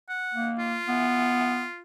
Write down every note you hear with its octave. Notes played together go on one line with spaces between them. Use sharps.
F#5
A#3
F4
B3